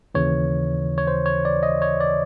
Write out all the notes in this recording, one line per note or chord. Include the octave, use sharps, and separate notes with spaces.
D#2 C#3 E3 C#5
C#5
C5
C#5
D5
D#5
C#5
D5